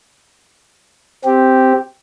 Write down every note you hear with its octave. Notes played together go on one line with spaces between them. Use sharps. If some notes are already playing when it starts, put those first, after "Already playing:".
C4 G4